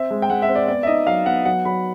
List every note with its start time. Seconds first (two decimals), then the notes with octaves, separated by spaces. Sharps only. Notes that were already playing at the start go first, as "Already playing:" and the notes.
Already playing: C4 E5
0.11 G#3
0.22 G5
0.30 G#3 F#5
0.42 E5
0.49 C4
0.55 D5
0.68 B3 D5
0.83 E5
0.87 D#4 D#5
1.07 F#3 F5
1.26 B3 F#5
1.45 F#3 F#5
1.65 F#3 B5